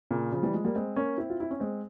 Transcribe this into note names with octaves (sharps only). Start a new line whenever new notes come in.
A#2 C#3
C#3 F3
E3 G3
F3 G#3
G3 A#3
G#3 C4
A#3 C#4
C4 E4
F4
E4
C#4
G#3 C4